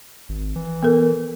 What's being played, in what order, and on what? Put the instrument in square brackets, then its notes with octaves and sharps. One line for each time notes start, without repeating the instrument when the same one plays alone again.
[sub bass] G#1
E3
[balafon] B3 A4 A#4